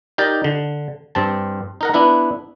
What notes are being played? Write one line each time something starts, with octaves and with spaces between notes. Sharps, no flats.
D#4 G4 A#4 D5 G5
D3
G2 C4 A5
D#4 A#4 F#5
B3 D4 E4 B4